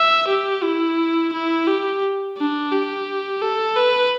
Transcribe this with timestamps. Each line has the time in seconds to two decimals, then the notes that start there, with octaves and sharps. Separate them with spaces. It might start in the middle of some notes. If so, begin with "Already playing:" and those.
Already playing: E5
0.28 G4
0.63 E4
1.33 E4
1.67 G4
2.38 D4
2.72 G4
3.41 A4
3.76 B4